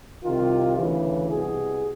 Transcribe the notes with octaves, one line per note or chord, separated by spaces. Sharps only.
C2 C3 D#3 F4
D2 C#3 E3
C2 B2 G#4